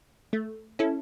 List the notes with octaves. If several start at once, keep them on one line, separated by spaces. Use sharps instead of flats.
A3
C#4 E4 A4